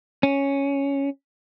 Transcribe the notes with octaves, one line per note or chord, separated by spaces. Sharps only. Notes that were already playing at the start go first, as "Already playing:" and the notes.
C#4